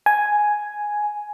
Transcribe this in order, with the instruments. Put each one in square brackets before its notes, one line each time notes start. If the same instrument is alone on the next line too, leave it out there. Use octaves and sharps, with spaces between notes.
[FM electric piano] G#5